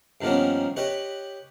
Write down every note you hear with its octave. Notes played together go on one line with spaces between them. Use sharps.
G2 D#3 F3 A#3 B3 C#4
G4 B4 C#5 D#5